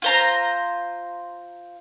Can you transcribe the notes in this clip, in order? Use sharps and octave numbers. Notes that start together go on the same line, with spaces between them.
F4 C5 A#5